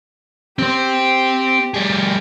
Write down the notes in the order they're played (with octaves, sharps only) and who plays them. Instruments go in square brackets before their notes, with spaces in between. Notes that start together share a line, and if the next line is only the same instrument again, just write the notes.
[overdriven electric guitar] C4 C5 [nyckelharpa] G4
[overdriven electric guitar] G3 G#4